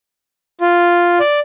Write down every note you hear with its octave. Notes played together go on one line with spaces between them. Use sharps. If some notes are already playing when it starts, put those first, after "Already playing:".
F4
D5